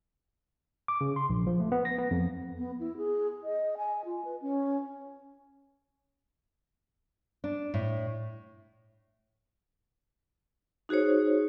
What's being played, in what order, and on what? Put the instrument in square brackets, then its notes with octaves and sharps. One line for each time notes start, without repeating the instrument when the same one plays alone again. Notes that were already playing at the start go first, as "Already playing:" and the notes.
[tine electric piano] D6
C#3
C6
A#1
F3
A3
B3
A#6
B3
F2
[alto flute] B3
E4
G#4
D#5
G#5
F4
B4
C#4
[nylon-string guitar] D4
A2
[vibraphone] D#4 F#4 G#4 C5 C#5